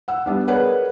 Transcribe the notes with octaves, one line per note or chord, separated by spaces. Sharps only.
F#5 E6
G3 B3 D4
G#4 A#4 B4 C#5 D5 F#5